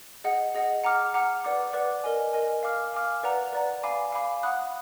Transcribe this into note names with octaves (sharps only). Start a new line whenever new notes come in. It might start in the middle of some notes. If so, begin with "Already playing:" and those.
G#4 D#5 F#5
G#4 D#5 F#5
F#5 A#5 D6 F6
F#5 A#5 D6 F6
B4 D5 F#5 D6
B4 D5 F#5 D6
A#4 D#5 G#5
A#4 D#5 G#5
F5 G#5 D6 F6
F5 G#5 D6 F6
B4 D5 F#5 A#5
B4 D5 F#5 A#5
F5 G#5 B5 D6
F5 G#5 B5 D6
F#5 B5 D#6 F#6